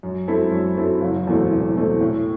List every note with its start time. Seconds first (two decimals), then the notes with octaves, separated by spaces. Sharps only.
0.03 F#2
0.28 F#3 C4 E4 A4
0.52 F#2
0.78 F#3 C4 E4 A4
1.01 F#1
1.27 E2 B2 A3 C4
1.51 F#1
1.75 E2 B2 A3 C4
2.00 A2